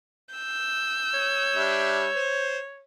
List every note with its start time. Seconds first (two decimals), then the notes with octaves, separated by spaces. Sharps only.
0.35 E6 G6
1.14 C#5
1.56 G3 D4 E5
2.16 C5